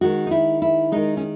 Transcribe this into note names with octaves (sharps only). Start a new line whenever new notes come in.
D#3 G#3 F#4
D#4
E4
E4
D#3 G#3 D#4
C#4